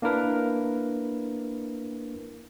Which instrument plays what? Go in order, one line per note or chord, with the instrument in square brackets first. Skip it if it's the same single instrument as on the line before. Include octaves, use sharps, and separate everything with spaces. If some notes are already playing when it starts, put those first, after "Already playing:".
[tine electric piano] A#3 D4 E4 A#4 B4